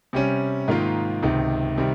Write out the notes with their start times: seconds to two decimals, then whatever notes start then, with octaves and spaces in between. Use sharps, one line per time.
0.13 C3 G3 C#4
0.68 G#2 D#3 A#3 F4
1.23 C#2 C3 D#3
1.78 C3 D#3 G3